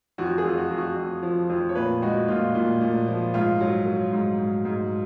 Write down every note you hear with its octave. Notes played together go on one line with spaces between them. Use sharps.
F2 F#4
G#4
F2
F#4
F2
F#4
F2
F3
F2
C#5
A#2 B4
G#3 F#4
A#2 F4
A#2
A#2
F3
G#2 F4
F#3
F#3
G#2
G#2
G#2